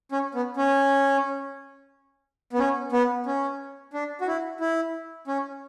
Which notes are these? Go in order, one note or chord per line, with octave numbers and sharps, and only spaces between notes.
C#4
B3
C#4
B3
C#4
B3
C#4
D4
F#4
E4
E4
C#4